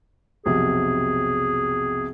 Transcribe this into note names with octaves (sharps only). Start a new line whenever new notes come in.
B1 F2 C3 G#4